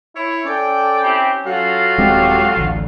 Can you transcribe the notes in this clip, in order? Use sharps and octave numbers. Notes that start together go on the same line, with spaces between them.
E4 C#5
C#4 A4 D5 G5
C4 E4 G4
F#3 F4 F#4 A4 F5
D#1 G#3 C4 G4
A1 D2